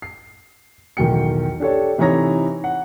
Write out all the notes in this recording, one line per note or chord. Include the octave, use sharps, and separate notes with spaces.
C7
B1 E2 D#3 F#3 G5 C#7
D4 G4 A4 C#5
C3 E3 D#4 C#5 A#5 A#6
F#5